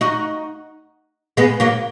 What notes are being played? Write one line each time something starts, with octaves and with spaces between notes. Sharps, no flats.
D#4 F#4
G#3 B3
F#3 A#3